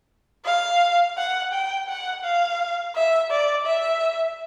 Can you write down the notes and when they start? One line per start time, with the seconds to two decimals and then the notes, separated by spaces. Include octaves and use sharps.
0.45 F5
1.18 F#5
1.53 G5
1.88 F#5
2.24 F5
2.96 E5
3.31 D5
3.66 E5